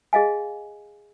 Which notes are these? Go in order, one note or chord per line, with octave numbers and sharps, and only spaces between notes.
G#4 D#5 F5 G#5